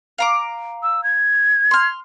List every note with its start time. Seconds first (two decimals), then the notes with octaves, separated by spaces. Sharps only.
0.18 F5 A#5 D6
0.83 E6
1.04 G#6
1.71 C6 F6